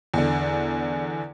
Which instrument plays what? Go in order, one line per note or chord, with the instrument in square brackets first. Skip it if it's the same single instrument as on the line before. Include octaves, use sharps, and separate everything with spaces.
[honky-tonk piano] E2 D3